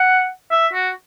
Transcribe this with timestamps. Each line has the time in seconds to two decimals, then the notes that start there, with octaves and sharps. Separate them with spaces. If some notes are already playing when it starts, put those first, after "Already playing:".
Already playing: F#5
0.51 E5
0.73 F#4